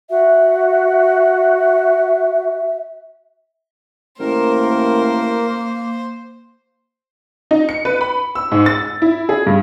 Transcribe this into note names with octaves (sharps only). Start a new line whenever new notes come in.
F#4 E5
A1 A#3 A#4 C5
D#4
C#7
B4
B5
E6
G#2
A6
E4
G#4
G2